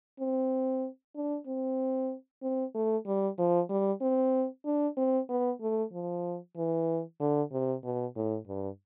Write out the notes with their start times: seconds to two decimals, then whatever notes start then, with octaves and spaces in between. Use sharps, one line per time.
0.20 C4
1.15 D4
1.47 C4
2.43 C4
2.75 A3
3.06 G3
3.38 F3
3.70 G3
4.01 C4
4.65 D4
4.97 C4
5.29 B3
5.61 A3
5.93 F3
6.57 E3
7.20 D3
7.52 C3
7.84 B2
8.16 A2
8.47 G2